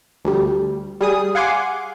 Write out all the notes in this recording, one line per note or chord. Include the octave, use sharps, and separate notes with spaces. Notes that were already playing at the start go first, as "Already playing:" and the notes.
D2 G3
G3 G#4 D#6
F5 F#5 G#5 C6 D6